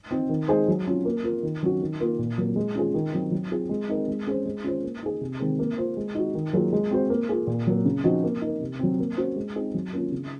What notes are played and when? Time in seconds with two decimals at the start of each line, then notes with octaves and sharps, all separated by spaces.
0.11 C4 D#4
0.29 D#3
0.48 G#3 D#4 G#4 C5
0.68 F#3
0.87 C#4 F4
1.05 A#3
1.24 F4 A#4
1.43 D#3
1.63 F#3 C#4 F#4
1.81 D#3
2.00 A#3 F4
2.19 A#2
2.38 F#3 A#3
2.56 G#3
2.75 C#4 F4 G#4
2.94 D#3
3.13 F#3 C4
3.32 F#3
3.51 C4 F4 G#4
3.69 G#3
3.89 C4 D#4 A#4
4.08 G#3
4.27 C#4 G#4 C5
4.45 G#3
4.64 C#4 F4 C5
4.83 A#3
5.03 D#4 G#4
5.21 C3
5.40 D#3 G#3 C4
5.59 A#3
5.78 F4 C5
5.97 G#3
6.15 D#4 F#4
6.34 D#3
6.53 F#3 A#3 F4 G#4
6.73 G#3
6.91 C4 F#4 C5
7.10 A#3
7.29 F4 G#4
7.47 A#2
7.67 F#3 A#3
7.85 C#3
8.04 F3 C4 D#4 F#4
8.23 A#3
8.41 D#4
8.47 A#4
8.61 C3
8.79 F#3 C4
8.99 A#3
9.17 C#4 F#4 C5
9.36 G#3
9.55 C4 D#4 G#4
9.74 F#3
9.93 A#3 C#4 F4
10.12 C#3